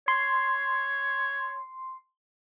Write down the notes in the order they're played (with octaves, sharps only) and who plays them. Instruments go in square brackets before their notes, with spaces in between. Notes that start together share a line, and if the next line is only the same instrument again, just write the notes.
[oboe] C#5 [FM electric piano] C6